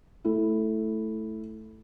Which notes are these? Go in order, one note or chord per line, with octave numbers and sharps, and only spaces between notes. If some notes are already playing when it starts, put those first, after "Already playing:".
A3 E4